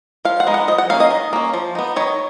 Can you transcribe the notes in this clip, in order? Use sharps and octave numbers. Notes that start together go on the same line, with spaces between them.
F3 F5
F#5
G#3 B3 D#4
F#5
F3 D#5
F#5
A#3 C#4 F5
D#5
D#3
A#3 C#4
F3
B3 D#4
D#3 C#5